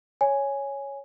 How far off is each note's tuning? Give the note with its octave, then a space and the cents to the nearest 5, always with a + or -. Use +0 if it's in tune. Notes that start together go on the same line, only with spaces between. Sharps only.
C#5 +0 G#5 +0